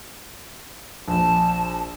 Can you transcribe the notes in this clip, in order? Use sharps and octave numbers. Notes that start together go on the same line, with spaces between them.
A#1 A5